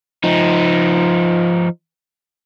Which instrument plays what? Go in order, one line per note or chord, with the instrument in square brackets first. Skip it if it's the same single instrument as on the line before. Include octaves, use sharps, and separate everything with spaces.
[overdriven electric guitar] F3 D#4